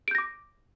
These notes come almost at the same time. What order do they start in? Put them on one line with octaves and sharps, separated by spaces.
D7 G6 A#6 D6